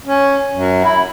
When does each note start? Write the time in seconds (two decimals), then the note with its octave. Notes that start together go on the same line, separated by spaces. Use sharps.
0.04 C#4
0.55 F#2
0.84 E4